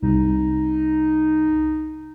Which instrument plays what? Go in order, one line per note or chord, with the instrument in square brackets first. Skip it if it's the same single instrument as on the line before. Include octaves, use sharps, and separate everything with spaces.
[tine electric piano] C2 [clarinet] D#4